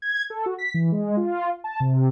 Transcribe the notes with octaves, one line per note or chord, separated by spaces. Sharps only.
G#6
A4
F#4
B6
E3
G#3
F4
A5
C3